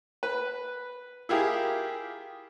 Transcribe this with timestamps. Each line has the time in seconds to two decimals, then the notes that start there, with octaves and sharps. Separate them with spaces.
0.23 B4
1.29 E4 F4 G4 G#4 A#4